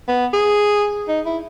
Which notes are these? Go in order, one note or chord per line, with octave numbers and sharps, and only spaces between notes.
B3
G#4
D#4
E4